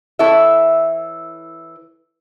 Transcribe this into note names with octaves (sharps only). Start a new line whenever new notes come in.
E3 E4 A4 C#5 E5